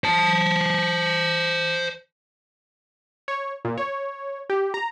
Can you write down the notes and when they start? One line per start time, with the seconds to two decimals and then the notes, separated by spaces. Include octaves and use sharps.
0.04 C5 A5
3.28 C#5
3.65 A#2
3.78 C#5
4.50 G4
4.74 A#5